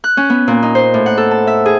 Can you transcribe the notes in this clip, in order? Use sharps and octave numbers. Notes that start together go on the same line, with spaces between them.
F#6
C#4
B3
A#2
D#4
C5
A2
F#5
A4
A5
E5
G#4